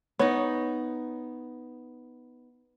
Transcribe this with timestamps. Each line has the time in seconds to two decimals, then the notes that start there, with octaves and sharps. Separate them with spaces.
0.19 B3 D#4 C#5